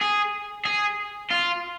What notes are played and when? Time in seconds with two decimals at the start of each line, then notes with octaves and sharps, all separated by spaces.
0.01 G#4
0.65 G#4
1.30 F4